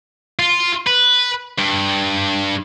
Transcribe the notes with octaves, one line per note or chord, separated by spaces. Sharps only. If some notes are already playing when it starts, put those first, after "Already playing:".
F4
B4
G2